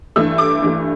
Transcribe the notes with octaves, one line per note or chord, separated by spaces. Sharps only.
G2 E3 A3 E6
D6
G2 E3 A3